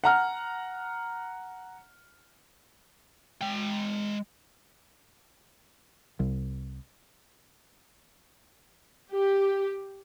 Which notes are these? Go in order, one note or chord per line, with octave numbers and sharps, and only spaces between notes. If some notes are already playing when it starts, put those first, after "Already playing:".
F#5 A#5 F6
G#3 G5
C2
G4